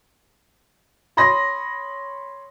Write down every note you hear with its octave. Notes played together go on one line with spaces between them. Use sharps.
C#5 B5 C6 D#6 A#6